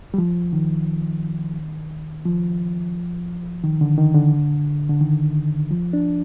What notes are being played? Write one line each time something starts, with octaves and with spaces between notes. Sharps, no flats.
G3
F3
D#3
F3
D#3
D3
D#3
D3
D3
D#3
F3
D4